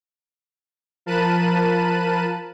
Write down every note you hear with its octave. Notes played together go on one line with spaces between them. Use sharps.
F3 A#4 A5 B5 F#6 D#7